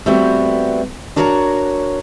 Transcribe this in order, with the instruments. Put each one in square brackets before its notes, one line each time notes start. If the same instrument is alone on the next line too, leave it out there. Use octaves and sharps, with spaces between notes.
[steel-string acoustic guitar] G3 A3 B3 C4 F#4
D4 F#4 A#4 C#5 E5 A#5